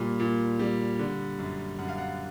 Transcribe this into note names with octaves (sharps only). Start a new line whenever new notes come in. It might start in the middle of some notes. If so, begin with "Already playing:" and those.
Already playing: A#2 G3
A#2
G3
D3
F#2
F#2 F#5
F5
F#5